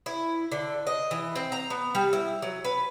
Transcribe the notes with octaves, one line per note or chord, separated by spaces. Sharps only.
E4
D3
D#5
E3
C4
A#5
B3
G3
E4
F#3
B4